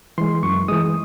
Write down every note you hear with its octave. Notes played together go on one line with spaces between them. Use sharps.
E3 G#3 C6
F#2 C#6
E3 G#3 D#6